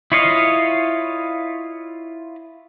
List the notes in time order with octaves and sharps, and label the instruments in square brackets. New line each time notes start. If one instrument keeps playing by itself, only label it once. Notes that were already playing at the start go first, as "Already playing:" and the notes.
[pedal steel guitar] E4 F4 C#5 D#5 F5